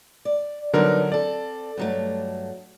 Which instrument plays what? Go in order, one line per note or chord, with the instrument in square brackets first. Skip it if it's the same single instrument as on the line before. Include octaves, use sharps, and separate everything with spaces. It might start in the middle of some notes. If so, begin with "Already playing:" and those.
[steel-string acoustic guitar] D5
[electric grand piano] D3 F#3 A#4 [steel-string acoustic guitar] G3 B3 D#4
[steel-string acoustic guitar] C4 A4 [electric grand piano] D5
[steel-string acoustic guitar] G2 F#3 A3